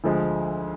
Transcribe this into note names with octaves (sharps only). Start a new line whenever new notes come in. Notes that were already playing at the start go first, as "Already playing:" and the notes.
D2 D3 F3 G#3